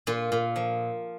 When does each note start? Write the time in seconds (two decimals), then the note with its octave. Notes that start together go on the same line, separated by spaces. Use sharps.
0.07 A#2 F4
0.32 A#2
0.56 F3